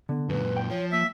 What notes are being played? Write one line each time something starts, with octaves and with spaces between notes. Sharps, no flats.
D3 B3
F#2 A#2 B4
G5
F3 C#5
A#3 E5